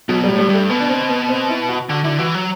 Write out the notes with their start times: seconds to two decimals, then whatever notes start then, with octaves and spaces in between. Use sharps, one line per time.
0.09 B2 F#3
0.24 A2 G3
0.39 G3
0.49 G2 A3
0.69 B2 B3
0.80 D4
0.89 C4
1.09 B3
1.29 C4
1.49 E4
1.69 F#4
1.89 D3 F#4
2.04 D3 E4
2.19 E3 F#4
2.35 F#3